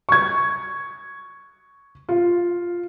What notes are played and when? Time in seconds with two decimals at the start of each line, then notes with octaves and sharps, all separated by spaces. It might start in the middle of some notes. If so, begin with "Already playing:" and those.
0.09 C#6 G#6
2.09 F4